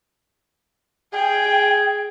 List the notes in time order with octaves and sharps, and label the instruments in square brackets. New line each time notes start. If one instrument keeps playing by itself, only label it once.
[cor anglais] G#4 [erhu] G5